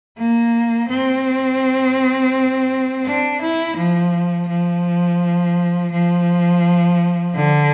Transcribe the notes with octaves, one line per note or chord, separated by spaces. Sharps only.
A#3
C4
D4
E4
F3
F3
F3
D3